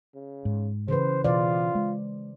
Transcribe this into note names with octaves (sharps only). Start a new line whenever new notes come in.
C#3
G#2
C#3 E3 B4 C5
B2 E3 F4 C5 D5
G#3